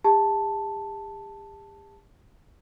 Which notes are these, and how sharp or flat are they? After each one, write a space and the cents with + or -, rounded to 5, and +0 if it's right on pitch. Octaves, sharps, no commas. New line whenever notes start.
G4 +45 A5 +0